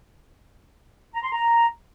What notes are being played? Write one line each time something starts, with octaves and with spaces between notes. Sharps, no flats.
A#5
C6
A#5